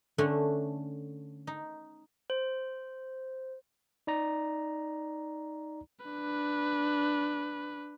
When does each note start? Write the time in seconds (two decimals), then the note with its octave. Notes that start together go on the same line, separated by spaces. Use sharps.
0.18 D3 A3 C#4 D4
1.47 D#4
2.30 C5
4.07 D#4 D5 A#5
6.06 D4 B4